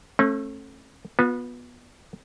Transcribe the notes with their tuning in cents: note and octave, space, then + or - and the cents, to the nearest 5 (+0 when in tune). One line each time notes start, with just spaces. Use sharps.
A3 +0 C#4 -40
B3 -15 F4 +45